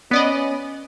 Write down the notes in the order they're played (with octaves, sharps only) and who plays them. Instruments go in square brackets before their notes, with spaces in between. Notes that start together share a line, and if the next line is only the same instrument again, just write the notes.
[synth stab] B3 D5 D#5 [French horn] C#4